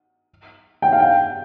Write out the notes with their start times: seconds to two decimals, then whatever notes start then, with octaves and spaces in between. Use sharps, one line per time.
0.82 G5
0.92 F5
1.00 G5